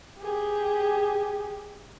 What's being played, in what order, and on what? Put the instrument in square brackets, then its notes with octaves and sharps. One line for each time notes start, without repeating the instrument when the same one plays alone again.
[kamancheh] G4 G#4